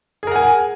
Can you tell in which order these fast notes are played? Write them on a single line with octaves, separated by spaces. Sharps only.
G#4 A#4 F#5 G#5